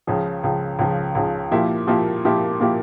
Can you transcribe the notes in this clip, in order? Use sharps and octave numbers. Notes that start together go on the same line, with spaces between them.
C#2 C#3 F3
C#2 C#3 F3
C#2 C#3 F3
C#2 C#3 F3
A#2 F3 A#3 E4 G4
A#2 F3 A#3 E4 G4
A#2 F3 A#3 E4 G4
A#2 F3 A#3 E4 G4